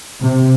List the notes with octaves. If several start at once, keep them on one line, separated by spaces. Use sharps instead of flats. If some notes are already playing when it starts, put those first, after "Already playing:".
C3